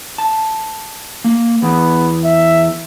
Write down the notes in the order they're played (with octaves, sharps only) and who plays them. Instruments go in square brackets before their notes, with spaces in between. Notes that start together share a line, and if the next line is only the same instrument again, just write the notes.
[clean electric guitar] A5
A#3
[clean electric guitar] E2 [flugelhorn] B3
[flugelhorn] E5